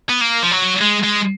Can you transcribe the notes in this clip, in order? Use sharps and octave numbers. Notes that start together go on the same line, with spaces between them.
B3
A#3
F3
F#3
G#3
G#3